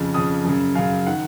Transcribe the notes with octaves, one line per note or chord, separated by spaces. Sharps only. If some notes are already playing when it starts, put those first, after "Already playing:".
Already playing: F2 C#3
F2 C#3 D#6
F#2 C#3
F#2 C#3 F5
D#3 F#5